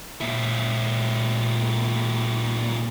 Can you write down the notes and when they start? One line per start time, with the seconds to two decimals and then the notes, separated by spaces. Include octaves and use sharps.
0.21 A#2 E4